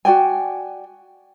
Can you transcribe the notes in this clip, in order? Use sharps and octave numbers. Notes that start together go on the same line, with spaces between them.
F#4 D5 G5 G#5